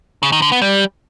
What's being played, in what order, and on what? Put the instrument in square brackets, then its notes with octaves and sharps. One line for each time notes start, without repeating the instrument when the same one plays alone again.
[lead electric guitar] C#3
D#3
D3
B3
G3